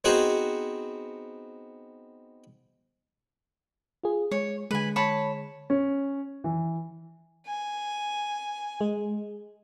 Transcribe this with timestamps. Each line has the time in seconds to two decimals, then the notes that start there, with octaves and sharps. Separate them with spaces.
0.04 B3 C4 D#4 F#4 G#4 C5
4.03 F4 G#4
4.31 G#3 C#5
4.71 D3 G#3 B4 G#5
4.96 C#5 A5 B5
5.70 C#4
6.44 E3
7.46 G#5
8.81 G#3